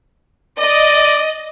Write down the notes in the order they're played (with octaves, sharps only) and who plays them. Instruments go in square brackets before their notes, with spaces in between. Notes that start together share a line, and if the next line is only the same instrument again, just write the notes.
[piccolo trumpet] D5 [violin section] D#5